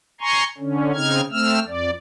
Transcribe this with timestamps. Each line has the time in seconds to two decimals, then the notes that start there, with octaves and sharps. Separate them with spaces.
0.21 G#5 A#5 C6 C#6
0.58 D3 C#4
0.94 C#3 C4 D#4 F6 G#6
1.32 A3 C4 E6 F6
1.67 F2 D5